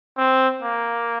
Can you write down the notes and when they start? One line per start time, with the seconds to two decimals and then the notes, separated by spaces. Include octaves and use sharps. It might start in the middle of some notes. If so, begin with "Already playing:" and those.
0.18 C4
0.63 A#3